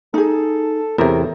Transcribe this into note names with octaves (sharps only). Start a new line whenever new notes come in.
D#4 G#4 A4
E2 A2 C3 A#4